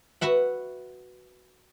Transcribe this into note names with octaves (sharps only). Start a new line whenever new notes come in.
F#4 B4 E5 F#5